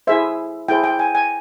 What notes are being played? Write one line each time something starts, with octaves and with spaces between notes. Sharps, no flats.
E4 G#4 C5 E5
E4 G#4 C5 G5
G5
G#5
G#5